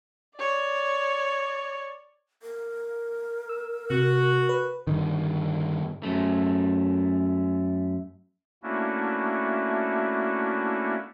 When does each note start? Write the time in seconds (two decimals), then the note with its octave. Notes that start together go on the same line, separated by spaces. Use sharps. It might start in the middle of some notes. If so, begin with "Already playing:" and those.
0.37 C#5 D5
2.43 A#4
3.49 E6
3.90 C3 F#4
4.49 B4
4.87 G2 D3 D#3
6.03 F#2 A3
8.63 A3 A#3 C#4 D4 E4 F#4